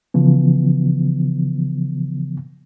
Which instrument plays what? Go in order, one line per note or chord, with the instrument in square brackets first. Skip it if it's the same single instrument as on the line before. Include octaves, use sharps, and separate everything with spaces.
[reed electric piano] C#3 E3 F3 B3